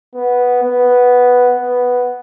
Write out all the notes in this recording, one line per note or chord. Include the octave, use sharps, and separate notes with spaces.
B3
B3
B3